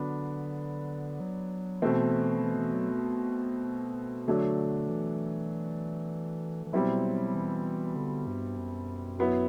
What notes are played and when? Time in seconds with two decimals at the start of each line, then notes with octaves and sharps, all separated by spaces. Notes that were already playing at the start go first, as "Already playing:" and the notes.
Already playing: D3 F#3 B3 D4
1.20 F#3
1.82 B2 E3 A3 C4
2.43 E3
2.58 E3
2.74 F#3
4.28 D3 F#3 A3 D4
4.89 E3
6.67 E3
6.73 B2 F#3 G3 C4 E4
7.34 E3
7.96 D3
8.27 G2
8.57 F#2
9.19 F#3 B3 E4